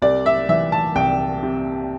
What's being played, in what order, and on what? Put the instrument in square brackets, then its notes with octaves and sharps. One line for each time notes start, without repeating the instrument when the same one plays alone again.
[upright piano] C2 D5
E5
E3 E5
A5
C2 G5
C3